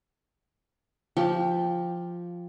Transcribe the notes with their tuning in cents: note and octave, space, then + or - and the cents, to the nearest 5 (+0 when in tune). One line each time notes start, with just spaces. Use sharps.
F3 +0 G4 +10 G5 +0